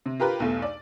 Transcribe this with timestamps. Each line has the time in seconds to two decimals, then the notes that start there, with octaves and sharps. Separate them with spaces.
0.06 C3
0.20 F4 G4 A#4 B4
0.40 B1 E2 A3
0.62 D5